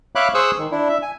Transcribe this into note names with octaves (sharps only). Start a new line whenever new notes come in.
C#5 E5 F5 B5 D6 F#6
G#4 C5 C#6 D#6 E6 F#6
D#3
D4 E4
E5
G#5